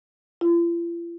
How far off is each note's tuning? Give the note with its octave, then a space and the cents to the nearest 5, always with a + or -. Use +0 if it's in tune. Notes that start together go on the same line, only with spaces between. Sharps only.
F4 -45